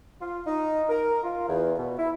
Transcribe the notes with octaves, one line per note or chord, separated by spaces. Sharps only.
F4
D#4
A#4
F4
E2
B2
E4